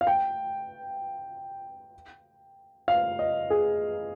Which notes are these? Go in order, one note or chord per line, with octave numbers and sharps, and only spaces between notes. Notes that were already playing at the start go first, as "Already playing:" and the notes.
F5
G5
F5
D#5
G#4